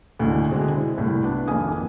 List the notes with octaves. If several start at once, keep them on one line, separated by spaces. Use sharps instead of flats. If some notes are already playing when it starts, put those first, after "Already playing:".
D2 A2 D3 G#3
B2 D3 G#3 C4 G#4
E4
C2 A2
B3 D4
G#1 F2 A#3 G#5 D#6